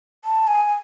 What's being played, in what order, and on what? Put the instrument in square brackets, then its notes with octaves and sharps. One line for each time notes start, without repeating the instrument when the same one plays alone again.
[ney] A5
G#5